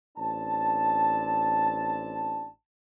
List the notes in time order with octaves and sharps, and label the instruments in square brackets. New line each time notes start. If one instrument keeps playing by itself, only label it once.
[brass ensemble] A1 C4 D4 A5